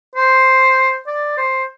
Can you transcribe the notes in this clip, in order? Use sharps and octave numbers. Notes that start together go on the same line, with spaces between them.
C5
D5
C5